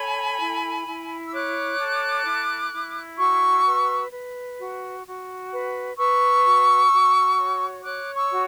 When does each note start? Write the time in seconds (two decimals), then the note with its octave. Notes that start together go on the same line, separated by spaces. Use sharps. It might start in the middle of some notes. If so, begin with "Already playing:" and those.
Already playing: A4 C#5 G#5 B5
0.39 E4
0.86 E4
1.26 E6
1.33 C#5 D6 F#6
1.79 A4
2.26 E4
2.72 E4
3.18 F#4 C#6 E6
3.66 B4
4.12 B4
4.58 F#4
5.05 F#4
5.51 B4
5.97 B4 C#6 E6
6.45 F#4
6.91 F#4
7.37 C#5
7.83 C#5 D6 F#6
8.15 C#6 E6
8.30 F#4